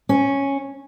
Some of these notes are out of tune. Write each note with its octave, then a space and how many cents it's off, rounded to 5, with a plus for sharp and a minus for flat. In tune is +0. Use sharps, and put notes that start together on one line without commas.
C#4 -5